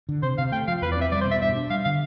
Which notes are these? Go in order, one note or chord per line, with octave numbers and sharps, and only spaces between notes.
D3
C3 C5
C3 F5
A3 G5
F3 F5
E2 B4
D5
C4 E5
G3 D5
C5
B2
E5
G2 E5
D4
G3 F5
D3 F5